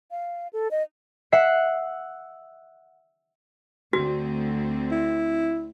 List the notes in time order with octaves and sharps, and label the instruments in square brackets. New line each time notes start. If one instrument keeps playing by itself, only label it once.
[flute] F5
A4
D#5
[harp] E5 F#5 C7
[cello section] D2 D3 C4 [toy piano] F#4
[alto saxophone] E4